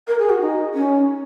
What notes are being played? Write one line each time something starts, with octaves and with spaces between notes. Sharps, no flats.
A#4
G#4
F#4
D#4
C#4